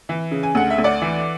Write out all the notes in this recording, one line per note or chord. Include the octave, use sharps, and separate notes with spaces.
E3
C#3
G#5
D2 F#5
E5
D2
D5 F#5
E3